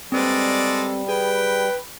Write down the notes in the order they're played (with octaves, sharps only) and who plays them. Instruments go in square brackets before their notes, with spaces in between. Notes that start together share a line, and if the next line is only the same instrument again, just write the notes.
[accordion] G3 [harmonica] G#3 A4 D5 [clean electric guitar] C4 B4 C5
[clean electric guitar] G#4 [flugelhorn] B4 [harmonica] G5